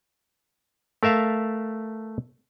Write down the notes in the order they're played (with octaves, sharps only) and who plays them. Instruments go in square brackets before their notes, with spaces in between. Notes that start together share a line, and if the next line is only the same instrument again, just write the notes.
[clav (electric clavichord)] A3 A#4 E5 F5 A5